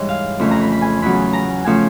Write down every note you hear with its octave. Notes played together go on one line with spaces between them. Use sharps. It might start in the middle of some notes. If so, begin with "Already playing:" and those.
Already playing: G#2 E3 G3 C#5
F5
F2 C#3 E3 A3 B5
A#5
B5
B5
G#5
E2 C#3 F#3 B5
A#5
C#3 F3 A3 G#5